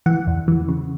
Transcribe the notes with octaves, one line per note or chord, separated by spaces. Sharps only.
E3 F#5
E2
E3
C#3